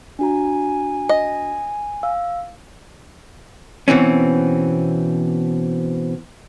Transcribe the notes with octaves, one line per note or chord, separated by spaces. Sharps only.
D4 F#4 G#5 A#5
D#5
F5 E6
B2 E3 C4 C#4